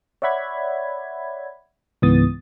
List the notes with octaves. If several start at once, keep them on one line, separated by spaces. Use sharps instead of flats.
C#5 D5 E5 F#5 B5 G#6
C#2 G#2 E3 B3 D#6 A6